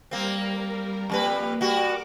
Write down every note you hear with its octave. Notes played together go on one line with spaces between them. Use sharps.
G3 A#3 C4 A#4
F2 G3 A#3 B4
G3 F#4 A#4 D6